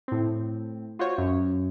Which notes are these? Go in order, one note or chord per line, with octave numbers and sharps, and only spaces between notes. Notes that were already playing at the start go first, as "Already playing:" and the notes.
A2 C4
F4 F#4 C5 C#5
F#2